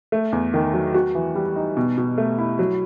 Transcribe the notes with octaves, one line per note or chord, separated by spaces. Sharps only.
A3
E2
D#3
F#3
F#4
E3
G3
D#4
B2
B2
A3
E4
F#3